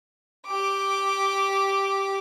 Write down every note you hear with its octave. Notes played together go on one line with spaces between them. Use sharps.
G4 D6